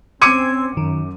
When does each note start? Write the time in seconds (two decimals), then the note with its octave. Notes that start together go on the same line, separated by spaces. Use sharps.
0.22 C4 C#4 C6 D6 E6 G#6 C#7 D#7
0.77 F#2 D#3